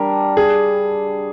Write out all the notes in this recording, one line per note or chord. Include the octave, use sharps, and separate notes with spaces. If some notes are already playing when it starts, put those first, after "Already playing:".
Already playing: G3 D4 G4 A#4
G#4